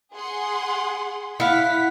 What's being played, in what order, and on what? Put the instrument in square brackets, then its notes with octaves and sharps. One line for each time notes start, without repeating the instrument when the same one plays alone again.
[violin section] G#4 F#5 C6
[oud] E4 [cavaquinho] F5 F#5 [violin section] B6